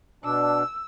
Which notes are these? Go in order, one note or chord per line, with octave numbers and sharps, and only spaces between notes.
B2 D4 E6